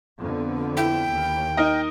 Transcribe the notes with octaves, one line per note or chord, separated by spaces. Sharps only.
F2 D3 B3
E4 G5
D#2
D#4 A#4 D#5